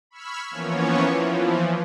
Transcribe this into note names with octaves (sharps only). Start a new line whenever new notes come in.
B5 C#6 E6 F6 G#6 B6
E3 F3 A#3 B3 C#4 C#5
E3 F3